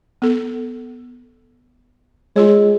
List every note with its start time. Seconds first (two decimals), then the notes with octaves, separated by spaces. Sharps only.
0.22 B3 A4
2.36 G#3 F4 G#4 C#5